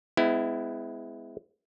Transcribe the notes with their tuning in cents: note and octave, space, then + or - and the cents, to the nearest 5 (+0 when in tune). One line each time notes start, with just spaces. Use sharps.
G#3 +0 B3 +40 E4 +0